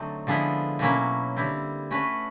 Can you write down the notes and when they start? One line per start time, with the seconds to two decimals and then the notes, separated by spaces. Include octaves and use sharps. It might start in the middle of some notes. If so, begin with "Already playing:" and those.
Already playing: D3 F#3 A3 C4 D#4
0.27 D3 F3 G#3 B3 E4
0.79 B2 F#3 A#3 C#4 E4
1.36 D3 G3 C4 E4
1.91 A3 C#4 F#4 B4